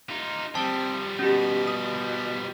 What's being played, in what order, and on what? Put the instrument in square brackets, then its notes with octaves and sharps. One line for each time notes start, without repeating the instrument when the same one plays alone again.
[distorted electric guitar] D#4 F4
[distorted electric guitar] F3 G3 [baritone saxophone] C4 [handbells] A5
[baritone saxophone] B2 [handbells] C#4 G4
[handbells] D#6